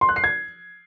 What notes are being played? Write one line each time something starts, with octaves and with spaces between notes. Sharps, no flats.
C6
F#6
C7
G#6